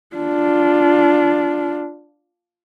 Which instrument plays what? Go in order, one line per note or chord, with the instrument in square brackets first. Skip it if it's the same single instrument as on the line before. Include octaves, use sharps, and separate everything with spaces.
[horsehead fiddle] D4 F4